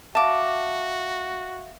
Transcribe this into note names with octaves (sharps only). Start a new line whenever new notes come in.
F#4 E5 F5 A5 D6